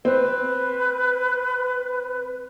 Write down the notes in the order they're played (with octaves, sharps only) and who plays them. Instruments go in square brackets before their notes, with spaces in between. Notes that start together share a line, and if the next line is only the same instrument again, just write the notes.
[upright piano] C4 [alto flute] B4